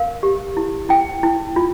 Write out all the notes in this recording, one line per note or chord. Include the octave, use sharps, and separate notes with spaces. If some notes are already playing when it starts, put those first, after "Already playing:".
Already playing: A#4 F5
G4
E4
E4 G5
E4
F4